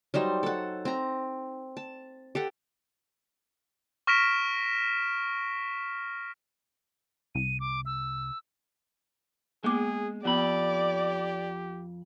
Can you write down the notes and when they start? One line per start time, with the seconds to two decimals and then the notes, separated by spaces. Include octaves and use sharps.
0.14 F#3 G3 D#4 C5
0.43 A4 F#5
0.85 C4 A#5
1.77 A5
2.35 G4 A4 F#5
4.07 C#6 F6 A#6 B6 D7 E7
7.35 C2 D#7
7.60 D6
7.86 E6
9.64 G#3 A#3 B3 G#4 D6
10.25 F2 B3 G4 D5 B5